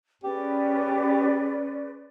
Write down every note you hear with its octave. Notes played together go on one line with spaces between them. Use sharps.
C#4 G4 G#4 B4 D5